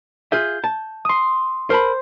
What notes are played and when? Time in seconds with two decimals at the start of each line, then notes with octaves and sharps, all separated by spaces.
0.32 F4 G#4 E5 G6
0.64 A5
1.05 C6 D#6
1.70 A#4 C5 A5 B5